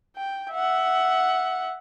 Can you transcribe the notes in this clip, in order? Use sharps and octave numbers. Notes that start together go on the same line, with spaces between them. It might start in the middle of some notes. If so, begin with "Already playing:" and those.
G5
E5 F#5